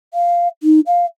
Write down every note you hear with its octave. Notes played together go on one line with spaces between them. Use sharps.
F5
D#4
F5